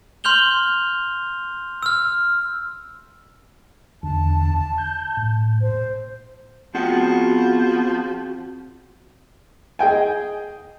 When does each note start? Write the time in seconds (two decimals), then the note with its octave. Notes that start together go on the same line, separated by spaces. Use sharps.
0.24 C6 F6 G6 F7 G7
1.83 E6 F6
4.03 E2 D3 A5
4.78 G6
5.17 A2
5.61 C5
6.75 F3 B3 C4 F#4 G#4 F#5
9.79 G#4 D#5 G5 G#5